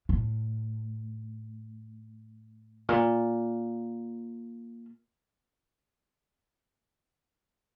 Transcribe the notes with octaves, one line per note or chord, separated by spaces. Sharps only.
A2
A#2